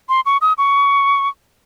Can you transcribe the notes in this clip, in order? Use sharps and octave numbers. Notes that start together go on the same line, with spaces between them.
C6
C#6
D#6
C#6